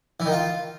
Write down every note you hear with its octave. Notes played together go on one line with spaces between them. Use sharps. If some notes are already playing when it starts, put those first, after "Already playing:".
E3
D#3
F4